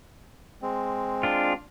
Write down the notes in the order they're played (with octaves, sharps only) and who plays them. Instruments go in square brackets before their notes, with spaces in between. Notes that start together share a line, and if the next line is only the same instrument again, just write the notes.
[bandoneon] G#3 C4
[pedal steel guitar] D4 F4